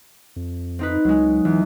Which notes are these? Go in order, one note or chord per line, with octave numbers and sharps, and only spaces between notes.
F2
C4 D#4 B4
C#2 F#3 G#3
E2 E3